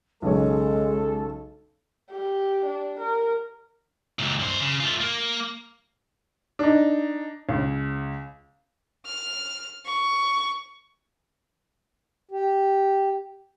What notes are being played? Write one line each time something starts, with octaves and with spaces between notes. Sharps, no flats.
B1 C#3 G#3 A4 C#5
G4
D4
A#4
C#2 A#2
G2 C5
C#3
A3 F4
A#3
D4 D#4
C#2
F6
C#6
G4